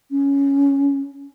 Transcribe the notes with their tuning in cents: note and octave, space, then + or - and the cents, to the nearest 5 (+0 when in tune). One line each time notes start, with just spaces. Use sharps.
C#4 +5